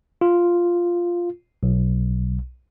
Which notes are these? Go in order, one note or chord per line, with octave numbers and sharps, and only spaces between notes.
F4
B1